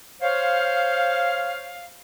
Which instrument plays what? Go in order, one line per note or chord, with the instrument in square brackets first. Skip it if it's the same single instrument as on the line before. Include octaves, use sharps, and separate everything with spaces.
[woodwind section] C5 C#5 F5